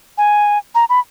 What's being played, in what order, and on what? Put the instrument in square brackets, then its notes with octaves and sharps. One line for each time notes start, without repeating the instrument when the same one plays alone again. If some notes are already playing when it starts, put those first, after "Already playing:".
[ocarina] G#5
A#5
B5